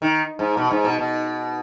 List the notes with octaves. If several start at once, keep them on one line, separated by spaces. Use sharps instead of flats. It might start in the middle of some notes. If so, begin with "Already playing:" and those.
D#3
G#2
B2
G#2
B2
B2